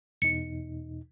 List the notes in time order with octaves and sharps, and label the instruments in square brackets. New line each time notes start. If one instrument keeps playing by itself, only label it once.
[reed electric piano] E2 B2 D#4 [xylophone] C#7